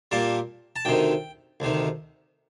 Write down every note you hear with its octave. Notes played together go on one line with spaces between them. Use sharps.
A#2 G3 A#3 A5
A5
D2 C3 D#3 G5
D2 C3 D#3